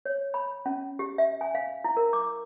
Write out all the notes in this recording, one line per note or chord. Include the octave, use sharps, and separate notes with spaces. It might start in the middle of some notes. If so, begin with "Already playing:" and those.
C#5
B5
C#4
G4
E5
G#5
F5
E4
A#4
D6